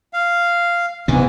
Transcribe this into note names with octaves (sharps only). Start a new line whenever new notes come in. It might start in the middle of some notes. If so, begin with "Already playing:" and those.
F5
G#2 C3 E3 B3